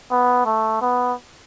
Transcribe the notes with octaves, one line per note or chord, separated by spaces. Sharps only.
B3
A3
B3